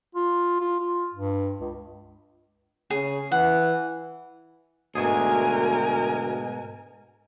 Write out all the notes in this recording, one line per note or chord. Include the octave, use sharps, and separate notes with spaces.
F4
F4
F4
G2
C#2
C#3 G#4
E3 F#5
D2 G#2 B2 G#4 A#4 G#5